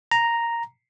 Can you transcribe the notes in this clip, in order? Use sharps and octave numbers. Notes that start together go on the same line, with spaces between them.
A#5